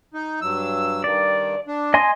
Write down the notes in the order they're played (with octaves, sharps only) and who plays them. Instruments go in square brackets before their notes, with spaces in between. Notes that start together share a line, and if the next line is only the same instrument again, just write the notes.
[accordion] D#4
G2 F#3 E6
[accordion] G2 D#3 [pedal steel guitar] D5
[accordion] D4
[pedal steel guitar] D#5 G#5 C6